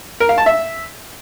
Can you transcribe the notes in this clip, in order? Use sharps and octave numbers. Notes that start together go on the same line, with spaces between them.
A#4
F5
A5
E5